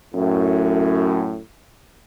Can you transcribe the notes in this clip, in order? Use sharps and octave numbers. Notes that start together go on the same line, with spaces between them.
F#2 A2